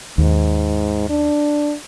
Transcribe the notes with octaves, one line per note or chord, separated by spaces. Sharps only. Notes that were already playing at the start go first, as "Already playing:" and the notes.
D#2 G#2
D4